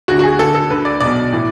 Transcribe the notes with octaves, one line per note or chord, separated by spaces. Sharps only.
D2 D3 F#4
F#4
G#4
D2 D3 A4
A4
D2 D3 B4
D5
B1 B2 D5
A2 E3